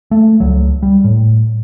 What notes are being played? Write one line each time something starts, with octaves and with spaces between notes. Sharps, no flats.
A3
C#2 F#3
G3
A2